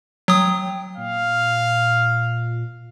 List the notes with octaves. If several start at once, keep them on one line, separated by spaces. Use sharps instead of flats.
F#3 G5 D#6
A#2 F5